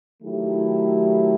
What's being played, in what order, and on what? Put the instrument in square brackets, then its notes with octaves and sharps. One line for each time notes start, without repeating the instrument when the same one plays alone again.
[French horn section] D#3 F#3 A3 E4 G4